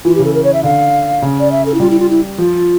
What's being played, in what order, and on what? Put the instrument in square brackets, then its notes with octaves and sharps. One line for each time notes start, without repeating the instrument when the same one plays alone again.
[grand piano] E3 [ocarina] F4
[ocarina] G4
[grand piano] C#3
[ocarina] A4
A#4
C#5
E5
[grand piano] D3 [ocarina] F5
[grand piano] C#3
[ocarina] D5
E5
A4
E4
[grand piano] G3 [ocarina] F4
[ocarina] E4
F4
E4
[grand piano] F3 [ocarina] F4